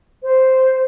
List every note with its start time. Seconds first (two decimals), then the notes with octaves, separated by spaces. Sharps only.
0.21 C5